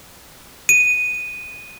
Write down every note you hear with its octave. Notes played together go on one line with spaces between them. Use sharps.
D#7